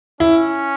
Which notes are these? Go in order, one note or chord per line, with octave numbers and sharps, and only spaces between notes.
C#4 E4